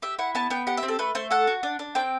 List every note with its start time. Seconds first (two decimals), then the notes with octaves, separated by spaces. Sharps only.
0.02 G4 E5
0.19 E4 F#5
0.35 B3 A5
0.50 B3 G5
0.67 G4 F#5
0.77 E5
0.83 C4
0.88 A4
0.99 A3 B4
1.15 A3 C5
1.30 A4 F#5
1.47 F#4
1.63 D4
1.79 D4
1.95 C4 G5